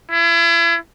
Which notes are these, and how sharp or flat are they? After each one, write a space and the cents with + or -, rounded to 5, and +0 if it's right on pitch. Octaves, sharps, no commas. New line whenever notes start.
E4 +35